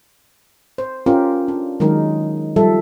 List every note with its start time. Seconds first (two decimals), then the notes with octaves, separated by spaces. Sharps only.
0.78 C5
1.06 C#4 F4 G4 A#4
1.48 D4
1.80 D#3 F#3 G#3 D#4 A#4
2.56 F3 G3 A4 E5